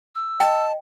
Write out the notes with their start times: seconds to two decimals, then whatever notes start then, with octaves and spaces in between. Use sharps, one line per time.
0.15 E6
0.40 D#5 G5 A5